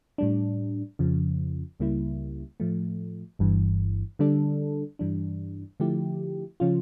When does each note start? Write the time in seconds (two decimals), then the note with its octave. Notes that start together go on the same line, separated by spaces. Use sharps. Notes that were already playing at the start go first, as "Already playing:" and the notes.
0.18 A2 G3 D4
0.99 F2 C#3 F3
1.80 C#2 C#3 G3 A#3 E4
2.60 A2 F3 A3
3.39 G1 G2 E3
4.19 D3 G3 D4 A4
4.99 G2 E3 G3 D4
5.80 D3 F3 A3 E4 G4
6.60 C#3 F3 C#4 F4